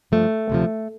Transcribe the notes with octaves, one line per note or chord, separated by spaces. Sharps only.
G2 F3 A3
D2 C3 F3